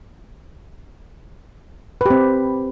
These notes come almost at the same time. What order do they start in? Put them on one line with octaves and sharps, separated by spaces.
B4 G4 C4